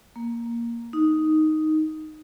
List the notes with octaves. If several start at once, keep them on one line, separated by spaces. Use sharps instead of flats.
A#3
D#4